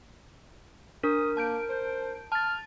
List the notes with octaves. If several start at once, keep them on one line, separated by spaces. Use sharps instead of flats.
D4 A#4 D#6
A#3 A5 G6 D7
C5
A5 F6 A6